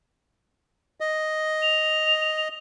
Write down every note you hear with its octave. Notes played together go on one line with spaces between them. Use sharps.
D#5
F7